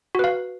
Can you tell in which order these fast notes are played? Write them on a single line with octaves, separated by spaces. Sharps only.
F#4 B4 F5